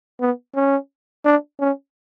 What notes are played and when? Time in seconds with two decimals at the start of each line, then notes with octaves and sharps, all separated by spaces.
0.21 B3
0.55 C#4
1.25 D4
1.60 C#4